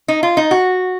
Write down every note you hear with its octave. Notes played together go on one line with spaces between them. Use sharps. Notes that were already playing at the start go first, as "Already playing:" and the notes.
D#4
F4
D#4
F#4